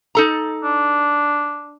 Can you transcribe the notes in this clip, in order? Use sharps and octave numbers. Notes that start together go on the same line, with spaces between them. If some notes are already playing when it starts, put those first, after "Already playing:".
D#4 A4 A#5
D4